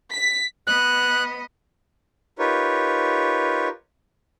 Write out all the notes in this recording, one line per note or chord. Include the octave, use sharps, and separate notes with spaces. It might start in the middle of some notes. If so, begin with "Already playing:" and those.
B6
B3 D#5 F#6
D#4 F4 G4 A#4 B4 C#5